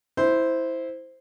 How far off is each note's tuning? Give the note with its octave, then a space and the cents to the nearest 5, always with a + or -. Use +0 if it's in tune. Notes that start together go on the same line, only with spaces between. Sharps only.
E4 -10 C5 -5